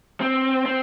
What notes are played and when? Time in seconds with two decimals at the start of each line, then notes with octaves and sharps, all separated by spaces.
0.20 C4
0.66 C4